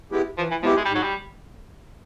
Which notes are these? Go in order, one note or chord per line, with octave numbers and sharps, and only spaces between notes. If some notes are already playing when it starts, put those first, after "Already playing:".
G#3 B3 E4 G4
E3 F3
E3
F3 G#3 B3 E4 G4
G#3
G3
G#2
F#3
G3